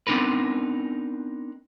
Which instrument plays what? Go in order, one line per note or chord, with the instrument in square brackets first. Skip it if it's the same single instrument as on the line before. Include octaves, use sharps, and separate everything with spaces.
[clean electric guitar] B3 C4 D4 D#4 A#4 B4